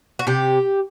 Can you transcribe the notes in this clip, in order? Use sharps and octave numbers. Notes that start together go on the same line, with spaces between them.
F#4
C3 G4